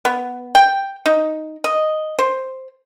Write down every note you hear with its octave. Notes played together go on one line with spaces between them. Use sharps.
B3
G5
D#4
D#5
C5